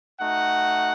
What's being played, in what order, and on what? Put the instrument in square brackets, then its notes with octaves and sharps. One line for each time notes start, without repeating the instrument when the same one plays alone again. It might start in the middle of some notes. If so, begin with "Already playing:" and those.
[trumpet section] A3 D#4 F#4 F#5